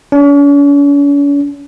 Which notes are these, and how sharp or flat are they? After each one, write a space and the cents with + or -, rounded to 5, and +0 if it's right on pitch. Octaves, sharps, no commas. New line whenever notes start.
C#4 +45